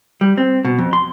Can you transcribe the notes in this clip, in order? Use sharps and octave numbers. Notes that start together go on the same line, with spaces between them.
G3
C4
B2
F2
C6